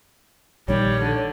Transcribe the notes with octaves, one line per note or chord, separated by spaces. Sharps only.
A#1 D#3 G3 C#5
D3